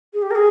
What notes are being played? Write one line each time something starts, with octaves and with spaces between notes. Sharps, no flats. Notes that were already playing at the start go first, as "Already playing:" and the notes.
G#4
G4
A#4
G#4